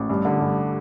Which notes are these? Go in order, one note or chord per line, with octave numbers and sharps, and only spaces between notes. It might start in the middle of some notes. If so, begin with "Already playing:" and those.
Already playing: A1
G2
D3
G2